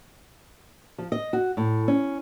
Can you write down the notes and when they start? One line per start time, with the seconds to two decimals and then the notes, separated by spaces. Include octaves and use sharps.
0.98 F3
1.12 D#5
1.33 F#4
1.57 A2
1.88 C#4